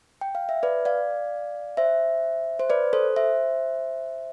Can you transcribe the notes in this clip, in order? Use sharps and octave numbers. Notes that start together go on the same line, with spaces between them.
G5
F5
E5
B4 D5
D5 F5
C5 E5
C5
B4 D5
A4 C5
C5 E5